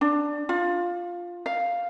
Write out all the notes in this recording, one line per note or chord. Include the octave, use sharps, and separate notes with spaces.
D4
F4
F5